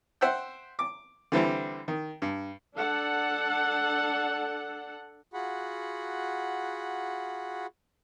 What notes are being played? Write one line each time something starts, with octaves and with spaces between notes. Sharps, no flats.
C5 E5 F#5 G5
D6
D3 E3 G3 C4
D#3
G2
D4 A4 F#5
F4 F#4 G#4 F#5 B5